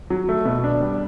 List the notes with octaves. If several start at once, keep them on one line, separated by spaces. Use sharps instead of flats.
F#3
A3
B2
D4
G3